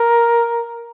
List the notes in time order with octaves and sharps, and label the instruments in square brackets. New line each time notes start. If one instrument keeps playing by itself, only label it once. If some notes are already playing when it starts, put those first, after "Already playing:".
Already playing: [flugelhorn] A#4